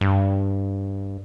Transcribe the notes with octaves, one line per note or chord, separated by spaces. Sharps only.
G2